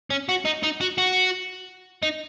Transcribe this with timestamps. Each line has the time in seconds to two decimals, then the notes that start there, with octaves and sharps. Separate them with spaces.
0.10 C#4
0.29 F#4
0.45 D#4
0.63 D#4
0.81 F#4
0.98 F#4
2.03 D#4